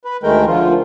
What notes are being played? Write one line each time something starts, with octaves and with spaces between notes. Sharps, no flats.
B4
D2 D#3 G#3 A3 A#4 G5
D3 F3 F4